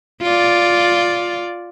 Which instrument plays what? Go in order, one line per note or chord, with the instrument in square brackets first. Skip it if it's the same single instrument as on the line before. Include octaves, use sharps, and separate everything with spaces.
[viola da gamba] F4 D5